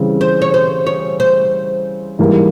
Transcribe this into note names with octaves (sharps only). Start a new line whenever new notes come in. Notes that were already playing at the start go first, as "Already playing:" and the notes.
Already playing: C#3 E3 G3 C4
C5
C#5
C5
C#5
C5
G#2 E3 G3 A#3